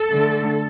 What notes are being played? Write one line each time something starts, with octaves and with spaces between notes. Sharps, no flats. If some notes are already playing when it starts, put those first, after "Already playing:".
Already playing: A4
D3 A3